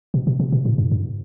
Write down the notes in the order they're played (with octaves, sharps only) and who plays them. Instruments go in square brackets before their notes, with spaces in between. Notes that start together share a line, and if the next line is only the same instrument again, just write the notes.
[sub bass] B2
B2
C3
B2
A2
G2
G2